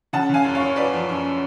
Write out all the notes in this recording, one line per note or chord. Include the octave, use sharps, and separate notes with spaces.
C#3 F#5 A5
C#3 F5 G#5
F#2
C#5 F5
F#2
F#2 B4 D5
F3
F#2